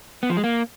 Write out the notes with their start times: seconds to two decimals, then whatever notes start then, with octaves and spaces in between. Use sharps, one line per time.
0.23 B3
0.30 F3
0.37 G#3
0.44 A#3